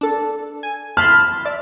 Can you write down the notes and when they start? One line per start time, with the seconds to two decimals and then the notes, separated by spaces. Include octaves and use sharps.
0.01 D4 A4
0.63 G#5
0.97 A5 B5 C6 F6
1.45 D5 E5